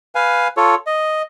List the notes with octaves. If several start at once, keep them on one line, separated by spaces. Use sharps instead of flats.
B4 F5 G#5
F4 A4 C#5
D#5